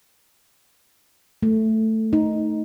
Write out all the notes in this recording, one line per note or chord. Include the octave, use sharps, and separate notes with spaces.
A3
D#4